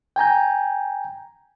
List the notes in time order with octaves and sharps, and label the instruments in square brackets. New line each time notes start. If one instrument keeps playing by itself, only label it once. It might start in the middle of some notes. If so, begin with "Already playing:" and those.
[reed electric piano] G5 G#5 A#5 G6